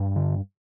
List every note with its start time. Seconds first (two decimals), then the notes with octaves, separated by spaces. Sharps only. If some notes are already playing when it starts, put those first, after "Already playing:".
Already playing: G2
0.16 D3